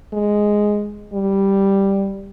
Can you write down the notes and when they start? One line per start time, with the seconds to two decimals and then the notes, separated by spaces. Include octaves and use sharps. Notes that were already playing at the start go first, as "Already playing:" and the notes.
0.13 G#3
1.13 G3